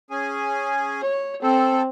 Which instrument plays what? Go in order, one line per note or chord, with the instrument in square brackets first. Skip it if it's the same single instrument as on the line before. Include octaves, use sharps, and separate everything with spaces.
[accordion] C#4 G#4 G#5
[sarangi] C#5
[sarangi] C4 [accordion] A4